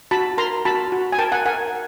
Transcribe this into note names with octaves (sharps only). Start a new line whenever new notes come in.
F#4 A5 B5
A#4 A#5 C6
F#4 A5 B5
F#4
G#5
A#4 G5 A5
F#5 G#5
A#4 F#5 G#5